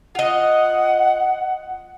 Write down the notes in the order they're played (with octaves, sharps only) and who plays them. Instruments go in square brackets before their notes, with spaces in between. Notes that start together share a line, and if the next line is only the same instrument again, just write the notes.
[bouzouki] F4 D#5 [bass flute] F#5